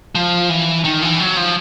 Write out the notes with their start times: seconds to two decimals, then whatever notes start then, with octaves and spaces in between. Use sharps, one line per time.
0.15 F3
0.49 E3
0.85 D#3
1.02 E3
1.20 F#3
1.37 F3